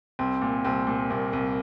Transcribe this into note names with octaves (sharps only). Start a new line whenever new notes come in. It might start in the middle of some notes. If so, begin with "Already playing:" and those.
C2 C4
A#2
C2 C4
A#2
C2 A#3
C2